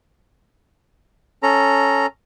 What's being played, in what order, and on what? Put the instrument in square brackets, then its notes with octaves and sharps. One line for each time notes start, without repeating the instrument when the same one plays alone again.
[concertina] C#4 A4 A#5